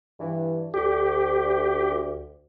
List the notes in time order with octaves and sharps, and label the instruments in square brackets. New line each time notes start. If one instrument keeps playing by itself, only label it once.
[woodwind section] G2 E3
[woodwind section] D2 [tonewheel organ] G4